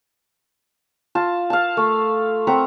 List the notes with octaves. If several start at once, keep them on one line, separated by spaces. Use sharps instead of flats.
F4 A5
F5 A5
A3
C4 E5 F#5 A#5